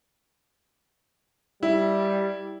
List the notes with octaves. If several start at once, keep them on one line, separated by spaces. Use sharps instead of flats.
G3 E4